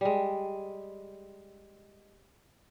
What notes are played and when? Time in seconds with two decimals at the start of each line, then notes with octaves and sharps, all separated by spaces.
0.01 G3 G#3